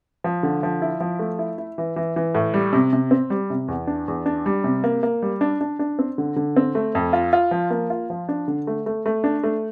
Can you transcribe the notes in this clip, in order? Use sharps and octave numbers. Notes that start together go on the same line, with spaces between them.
F3
D3
F3
E4
F3
A3
E4
E4
E3
E3
E3
A2
G3
C3
C3
C4
G3
C3
E2
D4
E2
D4
G3
C3
A#3
A#3
G3
D4
D4
D4
C4
D3
D3
C4
A3
F2
F4
F4
F3
A#3
F4
F3
D4
D3
A3
A3
A3
D4
A3